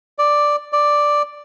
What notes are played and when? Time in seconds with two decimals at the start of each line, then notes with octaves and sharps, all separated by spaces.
0.19 D5
0.73 D5